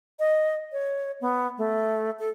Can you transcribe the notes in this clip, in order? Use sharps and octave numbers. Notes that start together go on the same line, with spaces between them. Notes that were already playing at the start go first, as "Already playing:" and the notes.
D#5
C#5
B3
A3
A4